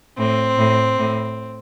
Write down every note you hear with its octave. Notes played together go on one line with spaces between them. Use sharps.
A2 C4
A2
A2